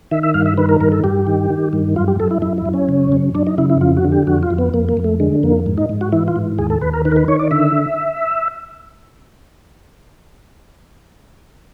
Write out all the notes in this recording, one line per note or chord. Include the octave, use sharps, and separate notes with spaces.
D#3 E5
E5
G2 F5
E5
D#3 B4
A#4
G2 A#4
A4
G2 G4
D#3
D#3
G2
F#2 F4
G4
F#2 A4
E4
F#2 E4
E4
F#2
C#4
C#3
F#2
F#2 D4
D#4
C#3 E4
E4
F2 F4
F#4
D3
G4
F2 F#4
F4
F2
B3
F2 A#3
A#3
F2
A3
D3 G#3
F2 A#3
G#2
D#4
G#2
F#4
E3 E4
F4
G#2
D#2 G#4
A4
D#2 B4
A#4
D#3 B4
A#4
B4
D#3 C#5
D5
D3 E5